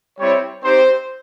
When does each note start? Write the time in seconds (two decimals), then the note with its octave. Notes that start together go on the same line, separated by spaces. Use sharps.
0.19 G3 C4 E4 C#5
0.63 C4 D#4 G4 C5